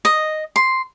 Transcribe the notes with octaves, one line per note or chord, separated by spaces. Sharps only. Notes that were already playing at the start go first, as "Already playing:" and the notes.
D#5
C6